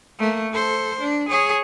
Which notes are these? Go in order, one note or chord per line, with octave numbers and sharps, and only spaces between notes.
A3 A#3
A4 C5
D4
G#4 C#5